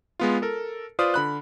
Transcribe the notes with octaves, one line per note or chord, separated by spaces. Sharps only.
G#3 B3 F4
A4 A#4
F4 B4 C5 D5 D#6 F6
D3 B5 F#6